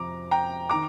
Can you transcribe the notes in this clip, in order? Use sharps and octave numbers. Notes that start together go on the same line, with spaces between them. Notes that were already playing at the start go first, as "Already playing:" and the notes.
Already playing: F2 C3 F3 A#5 D6
G5 A#5
D#3 A#5 D6